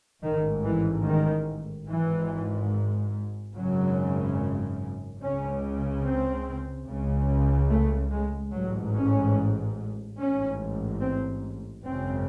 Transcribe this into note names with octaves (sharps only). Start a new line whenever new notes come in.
A1 G#2 D#3
E3
D#3
G#1 G#2 E3
G#1 F#2 C#3 F#3
C#2 C#3 C#4
C4
C#2 C#3
A3
G#3
A1 G#2 F#3
C#4
A1 G#2 C#4
C4
G#1 F#2 C#3 C4